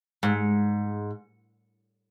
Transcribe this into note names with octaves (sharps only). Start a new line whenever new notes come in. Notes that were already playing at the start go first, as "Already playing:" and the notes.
G#2